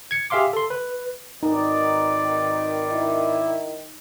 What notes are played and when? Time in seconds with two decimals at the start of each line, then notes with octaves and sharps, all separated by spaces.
0.11 G#6 C#7
0.30 G4 G#4 E5 F5 C6 D6
0.53 A4 C6
0.70 B4
1.43 G#1 D#3 D#4 B4 D5
2.93 E4